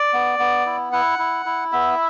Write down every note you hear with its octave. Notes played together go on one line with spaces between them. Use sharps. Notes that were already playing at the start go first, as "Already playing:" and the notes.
Already playing: D5
B3
B3
E4
E4 F#5
E4
E4
B3 E5